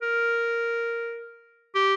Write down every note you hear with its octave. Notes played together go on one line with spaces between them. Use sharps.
A#4
G4